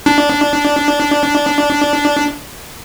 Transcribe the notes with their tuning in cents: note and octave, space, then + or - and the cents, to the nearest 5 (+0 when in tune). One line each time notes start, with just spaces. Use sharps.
D4 -10